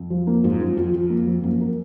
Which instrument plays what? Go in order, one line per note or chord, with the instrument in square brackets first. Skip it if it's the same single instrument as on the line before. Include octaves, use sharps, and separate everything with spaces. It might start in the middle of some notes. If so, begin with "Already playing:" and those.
Already playing: [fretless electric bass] F2
[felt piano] F3
A#3
[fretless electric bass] F2 G#2 [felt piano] F3
[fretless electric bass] F#2 [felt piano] F4
[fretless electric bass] F2 [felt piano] F4
[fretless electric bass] F2 [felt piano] F4
[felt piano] A#3
F3
[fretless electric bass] F#2 [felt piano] A#3
[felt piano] A#4